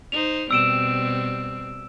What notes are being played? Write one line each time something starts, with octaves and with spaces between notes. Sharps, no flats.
D#4 C5 F7
B2 G3 C4 E6 D7 E7